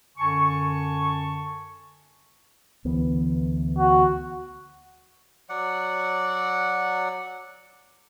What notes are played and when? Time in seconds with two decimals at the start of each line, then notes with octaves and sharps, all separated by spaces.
0.17 F#2 D3 G#5 A5 C#6
2.85 D2 E3 B3
3.78 F#4
5.49 F#3 D5 F#5